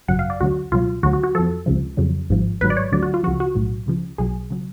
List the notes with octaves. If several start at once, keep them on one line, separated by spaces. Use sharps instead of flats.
G#1 F#2 C#3 F#3 F#5
F5
D5
D2 D3 F#3 F#4
C#2 B2 F#3 F4
D2 D3 F#3 F#4
F#4
F#4
F2 F3 A4
C#2 C#3 F3
F2 C#3 F#3
G#1 G#2 F3
G#1 G#2 F#3 B4
D5
C#5
D2 D3 F#3 D5
F#4
F4
C#2 C#3 F3 F#4
F#4
B1 A2 F#3
C#2 C#3 F3
B1 B2 F#3 G#4
C#3 F#3